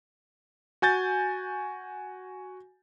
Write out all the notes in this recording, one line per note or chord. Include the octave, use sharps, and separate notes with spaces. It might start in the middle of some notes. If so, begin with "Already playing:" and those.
F#4 G#5 G6 A6